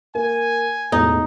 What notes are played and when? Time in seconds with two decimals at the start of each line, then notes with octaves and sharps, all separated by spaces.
0.15 A#3 G#5
0.92 E1 A2 D#4